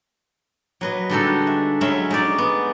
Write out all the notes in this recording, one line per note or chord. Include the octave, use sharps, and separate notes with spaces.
F#3 B4 D#5
D3 G3 G#3 D#4 F#4 A4
E5
F#3 G#3 C#4 E5 B5 C6
G#3 D#4 D5
B3